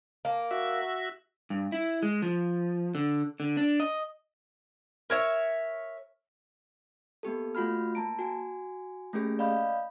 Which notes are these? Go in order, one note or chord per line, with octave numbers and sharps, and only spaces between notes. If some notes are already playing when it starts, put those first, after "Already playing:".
A#3
F#4 E5
G2
E4
G#3
F3
D3
D3
D4
D#5
A#4 C#5 E5
A#3 B3 G4 A4
A3 F4 F#4 B5 F6
A#3 A5 A#5 D7
F#4 G#5
A3 A#3 C#4 G4 G#4
D5 D#5 F5 B5 G6